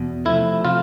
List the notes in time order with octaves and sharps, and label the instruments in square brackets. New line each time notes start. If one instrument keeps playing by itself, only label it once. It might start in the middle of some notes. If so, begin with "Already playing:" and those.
Already playing: [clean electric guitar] E2 B2
[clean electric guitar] C3 F3 A3 [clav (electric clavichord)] E4
[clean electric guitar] C3 F3 A3 [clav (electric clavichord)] F4